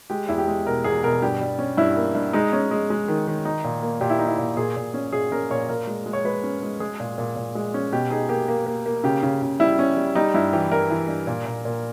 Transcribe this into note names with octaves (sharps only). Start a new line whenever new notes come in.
G#3 G4
E2 E4
G4
G#3
B2 A#4
E2 G#4
B2 A#4
G2 G4
G3
C#4
G2 E4
A#3
G2
G#3 D#4
C#4
G#3
G#3
D#3
D#3
D#4
A#2
A#3
A#2 G4
E4
D#4
E4
A#2
A#2 G#4
A#2
C#4
A#2 G#4
C#4 A#4
A#2 C#5
A#2 A#4
G#3
G#3
C#5
G#3 B4
C#4
G#3
G#3 G#4
A#2
A#2
A#2
G#3
C#4
B2 G4
D#4 G#4
A#3 G4
A#3
A#3
A#3
C#3 G4
C#3
C#3
G3 E4
C#4
G3
G3 D#4
G2 E4
E3 G4
G2 A#4
E3
G2
A#2
A#2
A#2